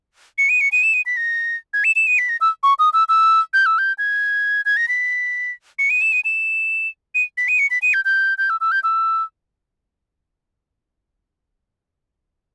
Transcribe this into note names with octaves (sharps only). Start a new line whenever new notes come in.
C#7
D#7
C#7
D#7
E7
D#7
B6
A#6
G#6
E7
E7
D#7
B6
A#6
E6
C#6
D#6
E6
E6
G6
E6
G6
G#6
G#6
A#6
B6
C#7
D#7
E7
D#7
E7
D#7
B6
D#7
C#7
B6
D#7
G6
G6
G6
E6
E6
G6
E6